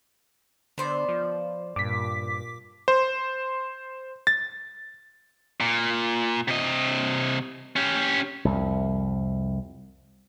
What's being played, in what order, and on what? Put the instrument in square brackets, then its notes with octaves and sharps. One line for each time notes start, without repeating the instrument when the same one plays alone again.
[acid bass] D3 [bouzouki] B3 C5 D5
[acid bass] F3
[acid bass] G2 [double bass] A#2 [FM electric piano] D6 B6
[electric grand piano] C5
A6
[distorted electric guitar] A#2
C3 D#5
C#4 G4
[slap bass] C2 F2